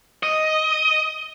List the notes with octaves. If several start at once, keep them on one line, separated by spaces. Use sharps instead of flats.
D#5